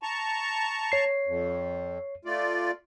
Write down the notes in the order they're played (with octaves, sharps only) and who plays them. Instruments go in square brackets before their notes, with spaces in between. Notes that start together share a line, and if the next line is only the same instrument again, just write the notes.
[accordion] A5 A#5 C#6
[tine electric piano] C#5 C7
[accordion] F2
A3 F4 D5